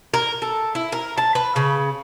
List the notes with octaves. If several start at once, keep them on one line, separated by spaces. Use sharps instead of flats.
A#4
A4
E4
A#4
A5
B4
C#3